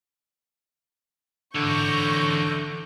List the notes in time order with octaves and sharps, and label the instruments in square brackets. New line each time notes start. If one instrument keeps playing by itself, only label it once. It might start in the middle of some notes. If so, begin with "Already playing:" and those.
[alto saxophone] D3 [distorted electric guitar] E3 C#5 [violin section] C#6 G6 A#6